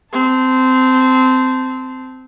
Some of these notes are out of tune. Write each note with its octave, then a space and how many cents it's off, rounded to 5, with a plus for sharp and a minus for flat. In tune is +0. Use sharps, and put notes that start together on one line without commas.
C4 -15 A5 +0